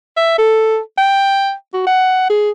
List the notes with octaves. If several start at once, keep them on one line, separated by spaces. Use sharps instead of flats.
E5
A4
G5
F#4
F#5
G#4